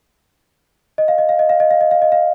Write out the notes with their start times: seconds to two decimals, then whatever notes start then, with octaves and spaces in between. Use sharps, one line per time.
0.98 D#5
1.08 F5
1.18 D#5
1.29 F5
1.39 D#5
1.49 F5
1.60 D#5
1.71 F5
1.81 D#5
1.91 F5
2.02 D#5
2.12 F5